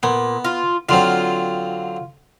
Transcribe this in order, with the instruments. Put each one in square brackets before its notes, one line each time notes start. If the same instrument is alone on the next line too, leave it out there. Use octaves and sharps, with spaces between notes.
[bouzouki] A#2 [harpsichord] B3
[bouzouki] F4
[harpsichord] D3 F#3 C4 [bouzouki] F4